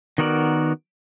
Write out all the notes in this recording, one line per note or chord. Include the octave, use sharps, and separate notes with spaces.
D#3 B3 F#4 A#4 D5